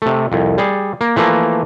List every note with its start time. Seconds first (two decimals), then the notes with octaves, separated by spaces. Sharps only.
0.02 C3 A3
0.32 C2 F2
0.58 G3 G#4
1.01 A#3
1.16 E3 F3 A3 A#3